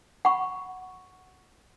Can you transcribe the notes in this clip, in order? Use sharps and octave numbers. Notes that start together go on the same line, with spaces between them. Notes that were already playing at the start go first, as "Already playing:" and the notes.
F#5 B5 C#6